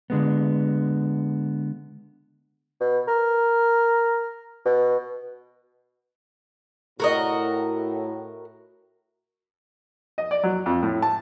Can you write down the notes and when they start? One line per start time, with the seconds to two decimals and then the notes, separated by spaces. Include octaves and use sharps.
0.10 D3 G#3 B3
2.80 B2
3.08 A#4
4.65 B2
7.00 A2 F#4 A#4 D#5
10.18 D#5
10.31 D5
10.43 F#3
10.66 F2
10.83 A2
11.02 A5